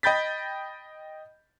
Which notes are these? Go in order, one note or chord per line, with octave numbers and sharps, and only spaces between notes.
D#5 G5 B5 G6 A6 B6